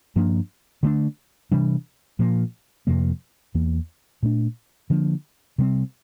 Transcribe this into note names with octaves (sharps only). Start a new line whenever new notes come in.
G2 F3 A#3 D4
D3 A3 D4
C3 E3 G3 D4
A#2 F3 A#3
F2 C3 F3 A#3
E2 E3 A#3
A#2 A3 D4
D3 F3 A#3 D4
C3 G3 C4